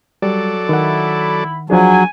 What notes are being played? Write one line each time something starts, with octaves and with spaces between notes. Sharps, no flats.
F#3 G3 A4 D5
D#3 E4 F#5 B5
F3 F#3 D4 G#4 G#5